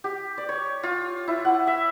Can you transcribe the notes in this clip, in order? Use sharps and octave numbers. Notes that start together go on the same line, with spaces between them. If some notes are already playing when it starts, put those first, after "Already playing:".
G4
D5
C#5
F4
E4
F#5
E5